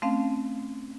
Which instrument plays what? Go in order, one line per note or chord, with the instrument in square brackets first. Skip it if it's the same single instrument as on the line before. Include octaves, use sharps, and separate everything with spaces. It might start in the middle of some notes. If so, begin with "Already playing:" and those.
[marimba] A3 C4 C#4 F5